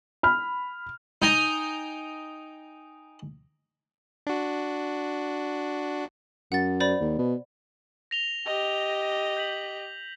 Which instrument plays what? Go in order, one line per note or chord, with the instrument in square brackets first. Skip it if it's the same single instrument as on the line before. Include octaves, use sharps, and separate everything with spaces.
[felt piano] B5 F6
[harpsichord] D#4 G5 G#5 A#5
[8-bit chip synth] D4 F#4
[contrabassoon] F#2 [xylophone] F#5 A6
[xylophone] C5 D5 B5
[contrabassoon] D#2
B2
[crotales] A#6 F7 G7
[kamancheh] G4 D#5
[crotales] G6 B6 F#7